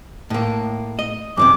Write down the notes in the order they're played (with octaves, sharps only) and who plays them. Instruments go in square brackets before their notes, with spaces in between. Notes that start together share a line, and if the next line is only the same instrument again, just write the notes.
[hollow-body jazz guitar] A2 A#3
D#5
[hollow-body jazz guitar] F#2 A2 C3 [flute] D6